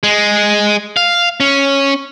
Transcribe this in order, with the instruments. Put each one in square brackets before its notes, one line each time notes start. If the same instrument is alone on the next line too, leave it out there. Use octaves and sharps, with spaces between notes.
[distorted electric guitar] G#3
F5
C#4